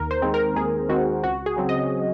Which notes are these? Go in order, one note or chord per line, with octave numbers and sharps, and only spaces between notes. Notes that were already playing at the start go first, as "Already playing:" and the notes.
Already playing: D#2 A#4
C5
D#3 G#3 C4
A#4
D#2 G#4
D#3 G#3 C4 F#4
C#2 F#4
G#4
C#3 F#3 C4
D#5